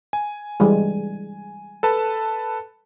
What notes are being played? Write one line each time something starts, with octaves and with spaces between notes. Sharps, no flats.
G#5
E3 G3 G#3
A4 B4 A5